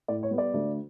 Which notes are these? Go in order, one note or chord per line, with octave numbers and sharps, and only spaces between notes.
A2 D5
C#5
G3 B3
D5
D2